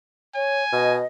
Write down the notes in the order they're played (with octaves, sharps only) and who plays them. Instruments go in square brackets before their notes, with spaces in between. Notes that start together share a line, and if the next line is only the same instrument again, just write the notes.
[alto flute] C#5 [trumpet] G#5
[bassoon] B2 [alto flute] D#5